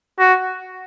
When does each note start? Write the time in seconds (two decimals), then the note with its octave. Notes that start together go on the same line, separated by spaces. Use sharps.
0.19 F#4